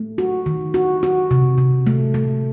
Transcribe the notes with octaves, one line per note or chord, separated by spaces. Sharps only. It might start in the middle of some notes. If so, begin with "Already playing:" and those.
Already playing: A3
F#4
D#3
F#4
F#4
C3
C3
A3
A3